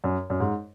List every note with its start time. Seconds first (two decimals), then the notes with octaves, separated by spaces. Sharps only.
0.04 F#2
0.30 F#2
0.40 G#2